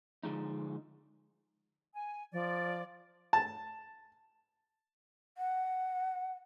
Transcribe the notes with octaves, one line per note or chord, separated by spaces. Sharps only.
D3 F3 G#3 D#4
G#5
F3 D5
A5
F#5